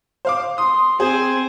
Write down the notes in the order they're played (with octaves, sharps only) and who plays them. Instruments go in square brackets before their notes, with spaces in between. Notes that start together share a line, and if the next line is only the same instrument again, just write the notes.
[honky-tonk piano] C5 F5 D6
[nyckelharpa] C6 [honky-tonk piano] D#6
[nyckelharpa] C4 G#5 [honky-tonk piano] G#4 [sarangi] C5